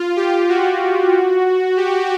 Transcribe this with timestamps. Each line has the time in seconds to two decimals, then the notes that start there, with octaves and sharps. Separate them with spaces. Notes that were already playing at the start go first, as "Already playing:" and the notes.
Already playing: F4
0.17 G4
0.49 F#4
1.77 G4